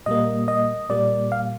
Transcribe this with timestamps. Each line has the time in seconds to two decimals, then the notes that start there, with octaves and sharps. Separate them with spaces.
0.06 A#2 G3 A#3 D#5
0.48 D#5
0.89 A#2 G3 A#3 D5
1.32 F5